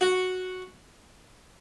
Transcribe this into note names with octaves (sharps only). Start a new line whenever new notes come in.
F#4